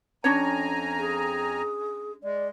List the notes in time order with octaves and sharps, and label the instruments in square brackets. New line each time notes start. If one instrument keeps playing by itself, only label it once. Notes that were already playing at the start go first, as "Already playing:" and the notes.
[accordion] F2 G#5 A#5 [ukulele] C#4 D4 C#5
[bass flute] G#4
[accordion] G#3 [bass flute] D5